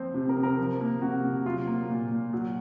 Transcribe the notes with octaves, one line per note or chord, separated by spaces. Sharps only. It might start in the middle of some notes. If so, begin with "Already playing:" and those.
Already playing: F3 C4
C3
A#4
C3
A#4
F3
A#3
C3 F#4
C3
F#3 F4
A#3
A#2
A#2
F#3